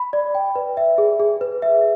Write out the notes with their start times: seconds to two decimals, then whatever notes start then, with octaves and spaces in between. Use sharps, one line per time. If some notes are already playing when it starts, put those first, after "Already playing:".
Already playing: B5
0.13 D5
0.35 G5
0.56 B4
0.77 E5
0.98 G#4
1.20 G#4
1.41 B4
1.62 E5